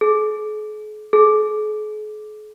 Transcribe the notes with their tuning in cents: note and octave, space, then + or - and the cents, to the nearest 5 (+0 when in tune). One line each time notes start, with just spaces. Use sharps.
G#4 +45
G#4 +45